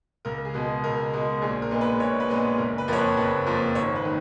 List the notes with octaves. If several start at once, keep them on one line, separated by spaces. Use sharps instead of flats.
C#2 A#4
G#4
B2 G#3
C#2 A#4
B2 G#3
A#1 G#4
A#4
A#2 G#3 B3
B4
A#1 C#5
B4
A#2 G#3 B3
F#1 A#4
B4
F2 F3 A#3 C#5
B4
F#1 B4
F2 F3 A#3
G#1 C#5
B4
D#3